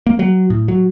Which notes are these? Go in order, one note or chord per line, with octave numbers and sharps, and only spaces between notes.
A#3
F#3
A2
F#3